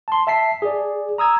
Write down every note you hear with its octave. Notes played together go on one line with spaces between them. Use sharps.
A5 C6
E5 A5 B6 C7
G#4 D5
A#5 D#6 E6 G#6